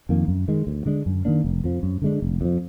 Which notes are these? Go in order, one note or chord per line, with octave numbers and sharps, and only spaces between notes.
F2 D#3 A#3
F#2
D#3 G#3
D2
D3 G#3 D4
F#2
D#3 A#3 D4
F1
F2 F3
F#2
D3 G#3 D4
F1
F2 F3